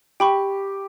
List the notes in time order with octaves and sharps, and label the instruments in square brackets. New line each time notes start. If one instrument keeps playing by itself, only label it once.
[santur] G4 [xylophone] G5 B5 C#6